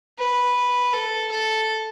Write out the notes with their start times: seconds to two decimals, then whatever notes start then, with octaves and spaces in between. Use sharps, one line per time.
0.18 B4
0.93 A4
1.31 A4